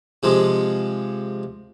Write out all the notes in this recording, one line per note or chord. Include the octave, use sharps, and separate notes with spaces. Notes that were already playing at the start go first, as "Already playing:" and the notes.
C3 F3 G#3